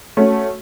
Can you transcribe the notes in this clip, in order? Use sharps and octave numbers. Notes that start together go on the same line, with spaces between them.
A3 C#4 F#4